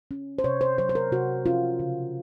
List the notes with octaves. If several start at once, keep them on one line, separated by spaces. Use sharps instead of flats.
C#4
C5
C3 C#5
C5
F#3 C5
C5
A#4
C3 F#4
C#4 F4
C#3